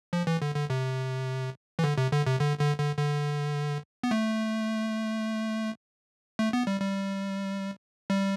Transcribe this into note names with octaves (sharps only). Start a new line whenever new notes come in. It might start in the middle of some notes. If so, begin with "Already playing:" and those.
F3
E3
D3
D3
C3
E3
D3
C3
D3
C3
D3
D3
D3
D3
B3
A3
A3
B3
G3
G3
G3